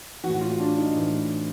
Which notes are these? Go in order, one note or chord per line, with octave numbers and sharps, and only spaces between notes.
A2 E3 F#4
F4
D4
D#4
A2 E3